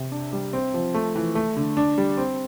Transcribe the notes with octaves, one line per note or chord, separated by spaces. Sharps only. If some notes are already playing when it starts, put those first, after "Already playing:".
Already playing: C3
D4
G3
C4
F3
A3
E3
A3
D3
D4
G3
C4